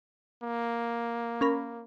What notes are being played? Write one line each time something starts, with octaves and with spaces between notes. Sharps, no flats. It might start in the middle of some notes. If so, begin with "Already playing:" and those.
A#3
C#4 A#4 B5